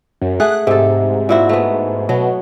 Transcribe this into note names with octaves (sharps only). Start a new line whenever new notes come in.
F#2
A3 G#4 F#5 F#6
G#2 C3 A4
A#2 E4 F#4
A3 B3
B2 F#3